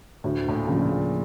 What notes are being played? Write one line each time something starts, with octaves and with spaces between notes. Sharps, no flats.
D2 A2
A2
A#2
C#3 F3
A#2